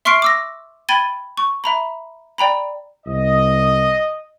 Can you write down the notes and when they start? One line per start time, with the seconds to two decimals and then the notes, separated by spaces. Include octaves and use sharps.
0.05 E5 C6 C#6 F6 C7 D7
0.22 D6 E6 A#6
0.89 G5 B5 G#6 A6 D#7 G7
1.37 C#6
1.64 E5 A#5 B5
2.38 D5 G5 A#5 B5
3.06 C2 D#5